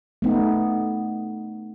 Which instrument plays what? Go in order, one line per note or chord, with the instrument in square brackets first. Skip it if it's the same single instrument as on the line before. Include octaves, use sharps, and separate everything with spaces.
[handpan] A3 B3 D#4